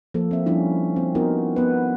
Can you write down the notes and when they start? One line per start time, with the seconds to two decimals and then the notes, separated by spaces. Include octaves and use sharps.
0.14 F3 A#3 A4
0.31 C4 E5
0.46 F3 G3 C#4 D4 E4 F4
0.96 C4
1.15 B3 D#4 F4 F#4 A#4
1.56 B3 B4